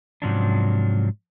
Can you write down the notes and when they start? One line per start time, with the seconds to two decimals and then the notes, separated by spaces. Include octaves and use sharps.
0.22 G#2 C3 F3 F#3 C#4 D4